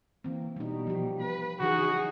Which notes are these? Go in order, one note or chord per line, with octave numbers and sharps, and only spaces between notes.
E3 A#3 C4
B2 G3 D#4
F3 G4
B4
C#3 E3 F#3 D#4 F#4 G#4